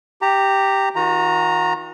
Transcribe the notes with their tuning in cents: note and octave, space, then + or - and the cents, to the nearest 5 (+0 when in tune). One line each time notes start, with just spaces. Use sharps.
G4 +0 A#5 -20
D#3 +40 F#4 -40 A#5 +0